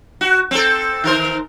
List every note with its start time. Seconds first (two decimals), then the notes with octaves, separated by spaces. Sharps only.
0.21 F#4
0.51 C4 A4
1.04 D#3 A#4 C5